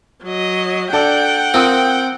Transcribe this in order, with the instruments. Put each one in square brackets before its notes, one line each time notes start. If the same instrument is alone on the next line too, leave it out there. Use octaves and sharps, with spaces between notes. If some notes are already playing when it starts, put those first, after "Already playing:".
[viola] F#3 D#5
[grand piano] D4 A4 D5 [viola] F#5 G5
[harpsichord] C4 [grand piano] F4 A#4 D#6